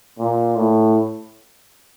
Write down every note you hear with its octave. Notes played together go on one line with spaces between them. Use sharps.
A#2
A2